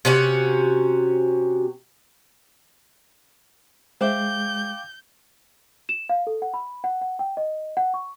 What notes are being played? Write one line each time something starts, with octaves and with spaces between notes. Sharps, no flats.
C3 C#4 F#4
G#3 C5 E5 F5 G5 D6 G6
E7
F5
A4
F#5
B5
F#5
F#5
G5
D#5
F#5
C#6